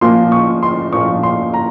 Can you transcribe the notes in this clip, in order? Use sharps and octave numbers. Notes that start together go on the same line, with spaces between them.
A#2 F3 A#3 C6
C#6
C6
A#2 F3 A#3 C#6
C6
A#5